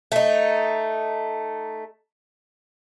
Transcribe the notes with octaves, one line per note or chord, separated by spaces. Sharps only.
A3 D#4